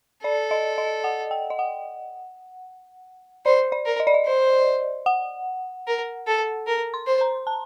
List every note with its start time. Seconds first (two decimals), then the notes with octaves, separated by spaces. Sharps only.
0.24 A4 D5
0.51 D#5
0.78 D#5
1.04 F#5
1.31 G5
1.50 D#5
1.59 F#5
3.45 C5 D5
3.72 D5
3.85 A#4
4.00 D#5
4.07 D5
4.14 D#5
4.25 C5
5.06 F#5
5.87 A#4
6.27 A4
6.67 A#4
6.94 C6
7.07 C5
7.21 A#5
7.47 A5